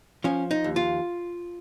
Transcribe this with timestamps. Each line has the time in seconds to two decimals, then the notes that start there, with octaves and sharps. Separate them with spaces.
0.24 F3 C#4
0.51 D#4
0.64 D#2
0.76 F4